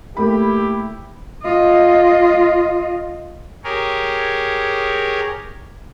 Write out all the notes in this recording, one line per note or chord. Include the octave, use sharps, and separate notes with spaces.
A3 A#3 E4 G4 B5
F4 D#5
G4 G#4 A#4 C#5